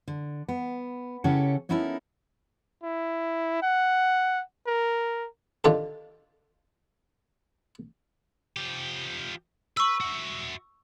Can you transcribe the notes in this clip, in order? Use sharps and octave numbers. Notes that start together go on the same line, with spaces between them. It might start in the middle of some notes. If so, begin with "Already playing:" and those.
D3
B3
C#3 C#4 E4 G4 A4 F#5
B3 C#4 D#4 E4 A4 A#4
E4
F#5
A#4
D3 D#3 F4 G4 A4
F3 G4
B4 C#6 E6
F#4 E5